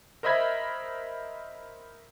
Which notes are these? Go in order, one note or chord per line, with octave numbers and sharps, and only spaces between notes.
A#4 C5 D#5 E5 B5 G#6